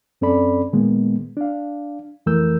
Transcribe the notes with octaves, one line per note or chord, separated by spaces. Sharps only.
F#2 C4 C#4 A4 D5 B5
A#2 D#3 G#3 A#3 B3
D4 F5
F2 E3 A3 A#4 E6 G6